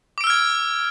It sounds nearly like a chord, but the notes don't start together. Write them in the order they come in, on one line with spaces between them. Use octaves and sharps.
D6 D7 E6 F6 G#6